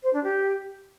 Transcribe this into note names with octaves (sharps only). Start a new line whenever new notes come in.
C5
D4
G4